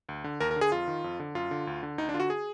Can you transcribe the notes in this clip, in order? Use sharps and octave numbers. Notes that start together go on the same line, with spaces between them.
D2
D3
D#2 A#4
A#4
D3
G#4
F2 F4
D#3
F2
D3
F#2 F4
D3
D2
D3
D2 D#4
D4
D3 F4
F#4
G#4